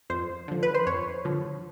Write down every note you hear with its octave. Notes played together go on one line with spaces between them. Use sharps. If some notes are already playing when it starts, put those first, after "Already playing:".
F2 C5
D3 F3
B4
C5
F2 C#5
D3 F3